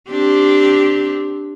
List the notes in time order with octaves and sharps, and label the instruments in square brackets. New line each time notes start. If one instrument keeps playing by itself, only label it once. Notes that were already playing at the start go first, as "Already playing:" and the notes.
[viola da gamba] C4 D4 G4